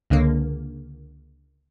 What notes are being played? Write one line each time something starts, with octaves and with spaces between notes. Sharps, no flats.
C#2 D3 A#3